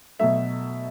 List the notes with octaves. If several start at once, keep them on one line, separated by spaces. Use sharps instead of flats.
B2 F#3 A3 E5